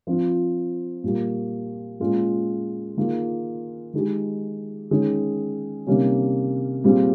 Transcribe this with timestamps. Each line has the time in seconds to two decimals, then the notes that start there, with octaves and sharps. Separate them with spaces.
0.07 F3 C4 F4
1.04 A#2 G3 A#3
2.00 A#2 G#3 C#4 F4
2.97 D#3 A#3 F4 G#4
3.94 D#3 G#3 D#4 G4
4.91 D#3 G#3 C#4 G#4
5.87 C3 D#3 G3 A#3 C#4
6.84 A#2 G3 C4 F4 G#4